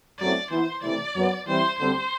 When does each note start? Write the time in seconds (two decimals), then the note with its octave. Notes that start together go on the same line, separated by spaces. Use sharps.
0.19 F#2 F#3 A3 C4 E4 D5
0.51 E3 B3 E4 C5
0.83 C3 E3 A3 D5
1.14 F#2 F#3 B3
1.46 E3 G3 C4 E4 C5
1.78 D2 D3 G3 C4 C5